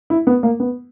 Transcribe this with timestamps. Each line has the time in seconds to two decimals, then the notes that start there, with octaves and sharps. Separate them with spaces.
0.10 E4
0.27 B3
0.43 A#3
0.60 B3